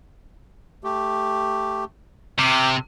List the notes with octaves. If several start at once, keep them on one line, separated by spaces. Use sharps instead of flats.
A3 G4
C3 G5 D6 F6